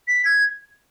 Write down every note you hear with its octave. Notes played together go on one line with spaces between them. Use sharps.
B6
G#6